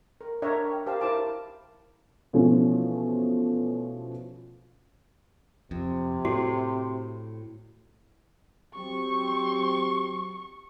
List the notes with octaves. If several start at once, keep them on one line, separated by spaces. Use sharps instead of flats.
A#4
D4 A#4 C#5 E5 A#5 C#6
G5
G4 A#4 C5 F5 A5
E4 A#4 C5 A5 D6
B2 E3 F3 A3 C#4
F2 C3
A2 F#4
F#3 C4 G4 C#6